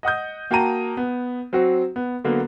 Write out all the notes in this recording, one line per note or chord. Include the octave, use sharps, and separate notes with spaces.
D#5 F#5 D#6 G6
A#3 F#4 G5 A5 A#5 D#7
B3
F#3 C4 F#4
B3
D3 F#3 A#3 B3